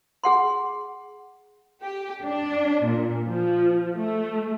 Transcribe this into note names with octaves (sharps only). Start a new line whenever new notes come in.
G#4 F#5 C6
G4
D4
A#2
F3
A3